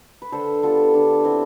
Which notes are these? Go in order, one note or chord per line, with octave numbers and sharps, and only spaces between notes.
B4
D3 A4 C5
G3 B3 F4 A4
D3 D4 F4
G3 B3 C4 E4